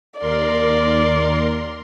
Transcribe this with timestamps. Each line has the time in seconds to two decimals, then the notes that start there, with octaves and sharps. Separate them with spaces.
0.18 D#2 A#4 D5 C6